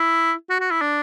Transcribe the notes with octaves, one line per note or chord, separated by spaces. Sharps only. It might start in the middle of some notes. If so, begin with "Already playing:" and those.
Already playing: E4
F#4
F#4
E4
D4